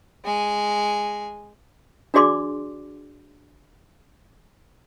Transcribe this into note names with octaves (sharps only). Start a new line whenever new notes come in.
G#3 G#5
D4 F#4 G#4 D5 C6 D6